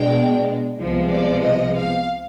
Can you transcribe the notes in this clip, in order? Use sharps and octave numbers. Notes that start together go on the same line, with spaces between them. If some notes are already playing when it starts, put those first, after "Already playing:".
Already playing: B2 G#3 D4 G5
C2 C3 F3 G#3 B3
D5
D#5
F5